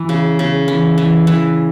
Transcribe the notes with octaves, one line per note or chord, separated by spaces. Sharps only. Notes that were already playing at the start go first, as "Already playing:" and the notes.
Already playing: E3
C#3
C#3
E3
E3
E3